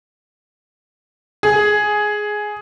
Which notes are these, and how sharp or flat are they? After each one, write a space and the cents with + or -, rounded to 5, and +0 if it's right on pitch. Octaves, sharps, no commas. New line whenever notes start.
G#4 +5